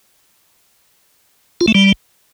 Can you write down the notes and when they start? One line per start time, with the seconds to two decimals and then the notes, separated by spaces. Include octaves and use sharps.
1.61 F4
1.68 A3
1.75 G3